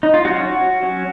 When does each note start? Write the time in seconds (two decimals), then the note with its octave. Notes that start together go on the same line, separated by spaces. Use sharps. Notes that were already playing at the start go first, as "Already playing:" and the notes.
0.03 D#4
0.14 F4
0.25 F#3 C#4 F#4
0.83 F#3 C#4